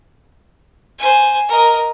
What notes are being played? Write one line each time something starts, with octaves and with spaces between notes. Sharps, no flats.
C5 G#5
A#4 D#5